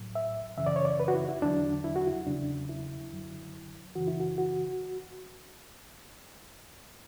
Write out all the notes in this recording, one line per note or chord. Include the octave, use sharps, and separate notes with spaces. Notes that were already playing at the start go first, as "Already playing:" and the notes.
Already playing: A2 F#3
E5
F#2 C#3 E3 E5
D5
C#5
D5
B4
F#4
E4
E4
E2 D3 F#3 D4
E4
F#4
E4
E2 C#3 F#3 D4
E4
F#2 D3 F#3
F#2 C#3 E3 F#4
E4
F#4
F#4